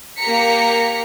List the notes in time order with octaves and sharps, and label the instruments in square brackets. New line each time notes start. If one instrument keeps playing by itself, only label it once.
[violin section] A#3 G4 A#5 B6 C#7